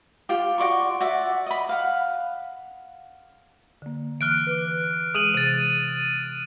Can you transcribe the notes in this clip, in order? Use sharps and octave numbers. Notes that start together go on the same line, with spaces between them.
F4 G4
F#4 D5 C6 C#6
F#4 D5 E5
D#5 B5
F5 F#5
D3 A#3
E3 F6 F#6 D7
B4 D6
E3 G#3 G#4 D#6 D#7 F#7
C3 A6 D#7